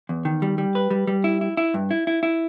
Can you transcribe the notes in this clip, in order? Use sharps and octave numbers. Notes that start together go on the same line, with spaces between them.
E2
D#3
G3
G3
B4
G3
G3
E4
E4
E4
G2
E4
E4
E4